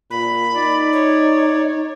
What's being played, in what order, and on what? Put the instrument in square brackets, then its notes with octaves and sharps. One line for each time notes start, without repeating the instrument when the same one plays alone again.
[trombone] A#2 [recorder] B5
[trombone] D#4 [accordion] D5
[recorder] C#5